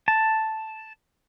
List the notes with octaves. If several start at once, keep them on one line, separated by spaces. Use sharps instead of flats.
A5